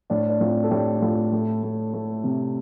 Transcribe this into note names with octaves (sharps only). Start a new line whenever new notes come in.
A2 D4
D4
A2 C4 F4
A4
A2 D4 G4
A2 F4 A4
A3
A3
A3
C3